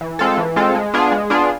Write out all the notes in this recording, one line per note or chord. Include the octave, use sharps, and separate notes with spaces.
E3
G#3 C4 F4 A4
E3
G#3 C4 F4 A4
G#3
B3 D4 F4 G#4
G#3
B3 D4 F4 G#4